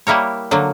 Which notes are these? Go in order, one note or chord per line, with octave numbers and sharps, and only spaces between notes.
G3 A#3 E4 A#4 C#5
D3 F#3 A#3